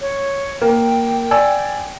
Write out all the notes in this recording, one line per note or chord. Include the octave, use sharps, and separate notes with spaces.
C#5
A#3 G5
D5 G#5 E6